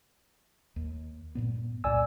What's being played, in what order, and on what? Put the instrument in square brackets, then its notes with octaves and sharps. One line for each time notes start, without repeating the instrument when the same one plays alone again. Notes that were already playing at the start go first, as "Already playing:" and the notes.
[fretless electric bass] D#2
G2 A#2 B3
[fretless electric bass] C2 F2 A#2 [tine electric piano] D5 G#5 E6